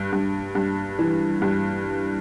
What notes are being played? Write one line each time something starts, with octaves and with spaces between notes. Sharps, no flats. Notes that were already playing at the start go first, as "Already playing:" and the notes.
Already playing: G2
G2
G2
E3
G2